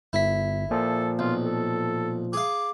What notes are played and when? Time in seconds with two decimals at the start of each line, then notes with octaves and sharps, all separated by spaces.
0.13 G1 E4 B6
0.71 A#2 F3 A4
1.19 B1 F4
1.43 A4
2.33 G#4 F5 D6